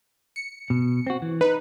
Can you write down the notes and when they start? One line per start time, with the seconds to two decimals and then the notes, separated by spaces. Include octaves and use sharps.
0.36 C#7
0.70 B2
1.07 C4 F#4
1.22 E3
1.41 D#4 B4